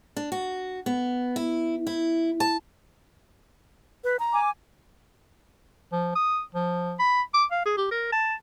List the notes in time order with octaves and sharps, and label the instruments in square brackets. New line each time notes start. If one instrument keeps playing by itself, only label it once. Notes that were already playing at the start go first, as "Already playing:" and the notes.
[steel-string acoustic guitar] D4
F#4
B3
E4
E4
A5
[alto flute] B4
A#5
[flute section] G#5 D6
[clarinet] F3
D#6
F3
B5
D6
F5
G#4
G4
A#4
A5